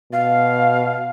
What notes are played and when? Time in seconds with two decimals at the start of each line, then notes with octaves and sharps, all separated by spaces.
0.12 B2 F5